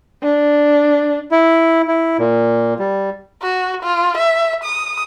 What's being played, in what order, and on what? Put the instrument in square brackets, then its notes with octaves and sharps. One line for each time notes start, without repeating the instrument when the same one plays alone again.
[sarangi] D4
[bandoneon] E4
E4
A#2
G3
[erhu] F#4
F4
E5
D#6